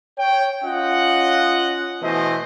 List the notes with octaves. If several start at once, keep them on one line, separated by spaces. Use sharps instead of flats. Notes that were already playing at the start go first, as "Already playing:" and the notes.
C#5 G5
C#4 F4 D#5 F#5
B2 E3 A3 C5 D#5